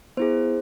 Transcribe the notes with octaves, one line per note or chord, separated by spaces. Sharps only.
B3 E4 G#4 C5